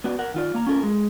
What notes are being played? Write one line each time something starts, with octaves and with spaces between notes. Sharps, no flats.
B3 F#4 D5
A#4 F#5
D#3 F4 D5
A#3 A#5
C#4 F4 A4 A#4
G#3